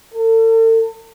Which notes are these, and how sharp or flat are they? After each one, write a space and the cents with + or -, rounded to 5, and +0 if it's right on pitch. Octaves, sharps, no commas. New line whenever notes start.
A4 +40